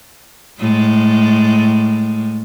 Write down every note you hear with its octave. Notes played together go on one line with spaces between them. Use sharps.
A2 G#3